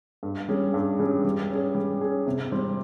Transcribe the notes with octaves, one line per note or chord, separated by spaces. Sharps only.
G2
G3 C#4 G#4
G2
G3 C#4 G#4
G3
C#4 G#4
G3
C#4 G#4
C3
G3 C4